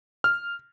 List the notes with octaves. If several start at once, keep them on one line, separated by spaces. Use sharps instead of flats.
F6